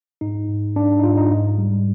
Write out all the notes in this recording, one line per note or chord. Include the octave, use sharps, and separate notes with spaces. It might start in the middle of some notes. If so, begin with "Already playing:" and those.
G#2 D#4
G#2
G#2 D4
D#4
G#2 F4
D#4
G#2
G3